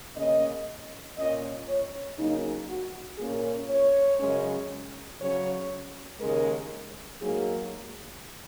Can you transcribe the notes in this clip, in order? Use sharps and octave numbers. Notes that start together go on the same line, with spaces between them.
C#3 A#3 C#4 D#5
A#2 A#3 C#4 D#5
C#5
C#3 F#3 A#3 D#4
F#4
A#2 A#3 C#4 G#4
C#5
F#2 C#3 G#3 C#4
C#3 F#3 C#4 C#5
D#2 C#3 G#3 A#4
G#2 F#3 A#3 G#4